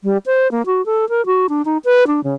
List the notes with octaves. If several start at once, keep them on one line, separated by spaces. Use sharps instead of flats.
G3
C5
A#3
F#4
A4
A#4
F#4
D4
D#4
B4
D4
C#3